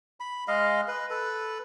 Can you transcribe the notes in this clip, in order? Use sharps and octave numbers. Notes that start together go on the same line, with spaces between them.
B5
G#3 D#5 F5
B4
A4 B4